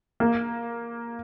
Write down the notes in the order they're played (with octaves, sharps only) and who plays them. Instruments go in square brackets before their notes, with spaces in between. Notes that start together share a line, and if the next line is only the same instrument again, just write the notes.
[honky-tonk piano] A#3